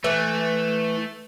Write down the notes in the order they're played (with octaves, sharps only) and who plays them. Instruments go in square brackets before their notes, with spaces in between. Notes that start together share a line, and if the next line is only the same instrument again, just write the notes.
[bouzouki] E3 [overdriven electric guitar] A3